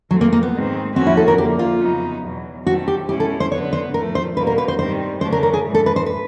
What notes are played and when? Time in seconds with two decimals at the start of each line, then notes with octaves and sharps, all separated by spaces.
0.11 F3 F#3 A3 C4
0.21 A#3
0.32 A#3
0.43 B3
0.53 G#2 D#3 G#3 C4
0.96 A2 F3 A#3 C4 C#4 F#4
1.07 E4
1.17 A4
1.28 A#4
1.38 F2 D3 F3 A#3 G4
1.59 F4
1.81 F2 C#3 F#3 B3 D#4
2.24 E2 B2 F#3
2.66 D#3 F#3 A3 C4 F#4
2.88 G4
3.09 B2 G#3 C#4 E4 G4
3.20 A4
3.40 C5
3.51 D3 F#3 B3 C#5
3.73 C5
3.93 A2 F3 A3 A#4
4.15 C5
4.37 B2 G3 A#3 B4
4.47 A#4
4.58 B4
4.68 C5
4.79 G2 D#3 G3 C4 C5
5.21 C#3 F#3 A3 D4 C5
5.32 A#4
5.43 A#4
5.53 G#4
5.64 G#2 E3 G#3
5.75 A4
5.86 B4
5.96 C5
6.06 B4